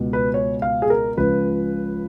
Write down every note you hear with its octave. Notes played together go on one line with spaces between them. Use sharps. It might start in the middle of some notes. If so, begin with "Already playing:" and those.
Already playing: C#2 B2
B4
C#5
F5
G#4
A#4
C#2 C#3 F3 B4